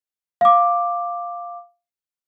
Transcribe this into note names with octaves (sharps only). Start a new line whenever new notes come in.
F5 D6